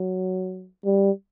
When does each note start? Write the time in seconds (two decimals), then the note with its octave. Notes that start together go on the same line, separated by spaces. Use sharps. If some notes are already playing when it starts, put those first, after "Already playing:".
Already playing: F#3
0.85 G3